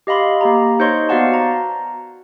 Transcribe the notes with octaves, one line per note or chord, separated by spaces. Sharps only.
G4 D#5 F5 B5 C6
A#3 G4 A#5
D#4 C5 C#5 D#5 C6 C#6
B3 F#4 D5 F5 F#5 A5
A#5